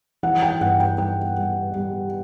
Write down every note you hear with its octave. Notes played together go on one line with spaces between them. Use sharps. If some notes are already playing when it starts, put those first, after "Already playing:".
E3 F#5
G5
G2 F#5
G5
G3 G5
G3
G3